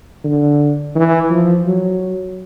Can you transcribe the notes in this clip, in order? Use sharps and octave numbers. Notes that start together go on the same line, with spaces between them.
D3
E3
F3
F#3